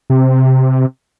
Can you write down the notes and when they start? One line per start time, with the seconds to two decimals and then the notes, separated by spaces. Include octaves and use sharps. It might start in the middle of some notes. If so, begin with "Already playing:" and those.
0.10 C3